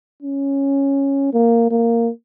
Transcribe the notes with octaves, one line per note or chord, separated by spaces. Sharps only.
C#4
A#3
A#3